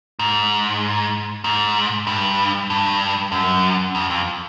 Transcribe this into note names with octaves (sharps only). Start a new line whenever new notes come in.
G#2
G#2
G2
G2
F#2
F2
F2